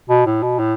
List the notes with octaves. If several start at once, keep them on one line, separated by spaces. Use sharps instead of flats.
B2
A2
B2
A2